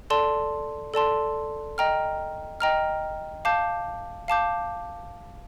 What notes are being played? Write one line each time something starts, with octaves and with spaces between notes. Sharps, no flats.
A4 D5 A5 C6
A4 D5 A5 C6
D#5 G5 A#5 F6
D#5 G5 A#5 F6
F5 A5 D6 G6
F5 A5 D6 G6